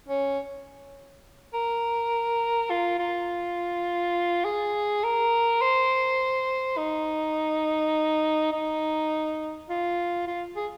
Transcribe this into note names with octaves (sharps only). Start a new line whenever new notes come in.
C#4
A#4
F4
F4
G#4
A#4
C5
D#4
D#4
F4
F4
G#4